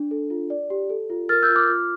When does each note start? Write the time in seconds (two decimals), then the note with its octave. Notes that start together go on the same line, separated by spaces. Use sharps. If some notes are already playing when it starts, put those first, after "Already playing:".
Already playing: D4
0.11 A4
0.30 F4
0.50 D5
0.70 G4
0.90 A4
1.10 F4
1.29 A#4 F6 A6
1.43 E6 G6
1.50 F4
1.56 D6 F6
1.69 F4